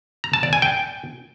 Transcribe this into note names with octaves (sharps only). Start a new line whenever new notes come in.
A#5
A5
D5
G#5
G5